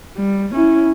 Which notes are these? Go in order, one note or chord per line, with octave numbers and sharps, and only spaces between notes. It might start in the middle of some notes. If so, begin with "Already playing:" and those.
G3
C#4 E4